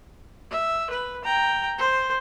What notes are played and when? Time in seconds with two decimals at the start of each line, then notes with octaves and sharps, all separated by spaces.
0.51 E5
0.90 B4
1.24 G5 A#5
1.78 C5